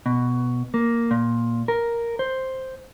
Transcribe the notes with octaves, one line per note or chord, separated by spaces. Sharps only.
B2
A#3
A#2
A#4
C5